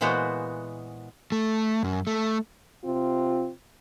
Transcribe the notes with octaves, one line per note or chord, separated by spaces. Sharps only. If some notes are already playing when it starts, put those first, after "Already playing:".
A#2 E3 G#3 B3 F#4 C5
A3
F#2
A3
C3 C4 F4